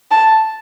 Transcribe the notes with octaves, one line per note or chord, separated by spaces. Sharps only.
A5